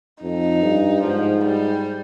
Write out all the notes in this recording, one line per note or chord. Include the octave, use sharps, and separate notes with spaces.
F2 D#4
G2
G#2 F3
G3